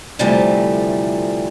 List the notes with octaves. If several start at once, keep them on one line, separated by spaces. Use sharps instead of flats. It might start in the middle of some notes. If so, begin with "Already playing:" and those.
D2 C3 E3 F3 G3 A3